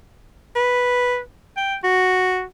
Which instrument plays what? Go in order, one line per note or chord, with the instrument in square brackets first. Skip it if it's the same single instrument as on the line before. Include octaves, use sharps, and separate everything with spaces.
[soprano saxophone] B4
G5
F#4